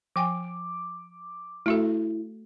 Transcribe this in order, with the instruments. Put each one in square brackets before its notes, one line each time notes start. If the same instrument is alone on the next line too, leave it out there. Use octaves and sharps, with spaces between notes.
[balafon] F3 G5 G#5 [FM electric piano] D6
[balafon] A3 F#4 A4 [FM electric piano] E4